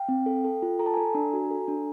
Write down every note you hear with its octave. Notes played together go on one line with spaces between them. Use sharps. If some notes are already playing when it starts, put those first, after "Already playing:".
Already playing: F5 G5
C4
A4
A4
F4
A4 A#5
A5
A4 G#5 A#5
D4
F#4
A4
D4